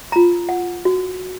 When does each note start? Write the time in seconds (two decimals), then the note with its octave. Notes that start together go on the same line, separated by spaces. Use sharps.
0.12 F4 A#5
0.49 F#5
0.85 F#4